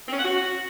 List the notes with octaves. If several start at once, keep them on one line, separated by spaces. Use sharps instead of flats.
C4
C#4
F#5
F#4